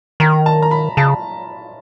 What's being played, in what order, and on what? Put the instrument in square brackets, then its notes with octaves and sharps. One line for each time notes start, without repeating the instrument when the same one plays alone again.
[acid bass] D#3 [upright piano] A#5
[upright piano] A5
A#5
B5
[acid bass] C#3 [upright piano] A5